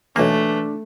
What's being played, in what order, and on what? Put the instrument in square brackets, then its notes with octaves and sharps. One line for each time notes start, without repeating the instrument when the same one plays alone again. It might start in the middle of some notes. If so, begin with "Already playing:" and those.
[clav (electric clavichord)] B1 A#3 [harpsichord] E3 [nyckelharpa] A3 [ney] D4